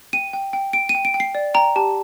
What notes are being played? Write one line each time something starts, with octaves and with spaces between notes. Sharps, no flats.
G5 D#7
G5
G5
G5 D7
D#7
G5
D7
G5
C7
D5
G5 A#5
G4 A5